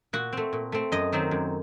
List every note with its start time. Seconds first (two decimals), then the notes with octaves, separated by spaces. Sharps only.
0.13 A#2 F#4
0.33 A3 C4
0.53 A#2
0.72 A3 C4
0.92 F#2 D#5
1.12 D#3 F#3 C4
1.31 F#2